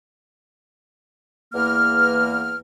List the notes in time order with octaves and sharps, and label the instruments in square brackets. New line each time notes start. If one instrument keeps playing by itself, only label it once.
[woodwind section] E2 A#3 F6